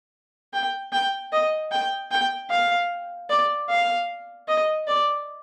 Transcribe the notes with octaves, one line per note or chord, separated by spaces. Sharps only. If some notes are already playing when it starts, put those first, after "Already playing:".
G5
G5
D#5
G5
G5
F5
D5
F5
D#5
D5